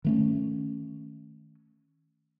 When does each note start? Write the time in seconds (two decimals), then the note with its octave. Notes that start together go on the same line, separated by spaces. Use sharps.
0.04 D#3 A3 C#4